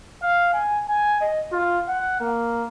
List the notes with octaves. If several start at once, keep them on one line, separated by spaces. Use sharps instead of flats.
F5
G#5
G#5
D#5
F4
F#5
A#3